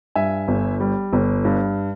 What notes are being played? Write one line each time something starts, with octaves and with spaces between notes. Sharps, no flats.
G2 E5 G#5
G1
G3
G1
G2